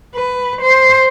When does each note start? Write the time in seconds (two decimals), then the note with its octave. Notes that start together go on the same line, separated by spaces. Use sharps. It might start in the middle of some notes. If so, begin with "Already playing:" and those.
0.15 B4
0.62 C5